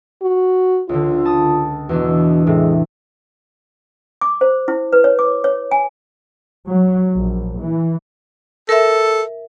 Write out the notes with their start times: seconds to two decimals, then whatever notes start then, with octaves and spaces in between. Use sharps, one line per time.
0.22 F#4
0.89 C#2 D3 F4
1.25 A5 D#6
1.89 E2 B2 E3 D4
2.47 A2 C3 G#3
4.21 D6
4.41 C5
4.68 E4
4.92 B4
5.04 C#5
5.19 D6
5.44 C#5
5.71 G#5
6.66 F#3
7.14 A#1
7.60 E3
8.69 A4 A#4 E5